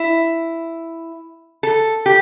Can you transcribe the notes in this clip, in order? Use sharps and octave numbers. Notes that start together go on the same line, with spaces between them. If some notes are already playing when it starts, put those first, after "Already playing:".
Already playing: E4
A4
G4